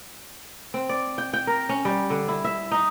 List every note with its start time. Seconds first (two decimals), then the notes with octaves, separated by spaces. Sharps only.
0.74 C4
0.89 D5
1.18 G5
1.33 G5
1.47 A#4
1.69 C#4
1.85 G3
2.10 D3
2.28 E4
2.44 E5
2.71 D#4